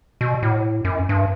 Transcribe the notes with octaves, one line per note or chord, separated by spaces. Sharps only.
B2
A2
F#2
G2